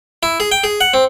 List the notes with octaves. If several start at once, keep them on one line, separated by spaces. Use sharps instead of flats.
E4
G#4
G5
G#4
F#5
C4